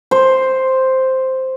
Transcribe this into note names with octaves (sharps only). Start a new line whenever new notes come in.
C5